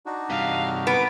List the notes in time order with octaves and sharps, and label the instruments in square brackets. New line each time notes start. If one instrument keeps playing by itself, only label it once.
[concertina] D4 D#4 F#4
[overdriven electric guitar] G2 C3 [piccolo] F5
[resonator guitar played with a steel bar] B3 [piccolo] D7